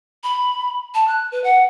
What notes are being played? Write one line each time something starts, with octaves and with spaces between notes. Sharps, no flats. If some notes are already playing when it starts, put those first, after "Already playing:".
B5
A5
F#6
B4
F#5